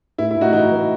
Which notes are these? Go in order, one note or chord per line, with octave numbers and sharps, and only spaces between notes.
A2 E4
E4
A2 D#4 F#4
E3 D#4 F#4
E3